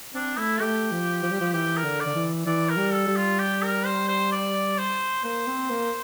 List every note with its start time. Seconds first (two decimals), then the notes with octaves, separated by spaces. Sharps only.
0.14 C4 D4
0.38 A3 E4
0.61 A3 G4
0.92 F3
1.23 F3
1.32 G3
1.41 F3
1.54 E3 G4
1.77 A#4
1.85 D3
2.00 D5
2.06 D3
2.15 E3
2.46 E3 D5
2.69 A#4
2.77 G3
2.93 A4
3.08 G3
3.16 F4
3.39 G4
3.62 A#4
3.85 C5
4.08 C5
4.32 D5
4.78 C5
5.24 A#3 C5
5.48 C4
5.70 A#3